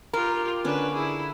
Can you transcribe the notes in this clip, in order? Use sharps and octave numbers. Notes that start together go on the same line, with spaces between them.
F4 G4 A#4
D3 C#4 D4 B4
E4 G#4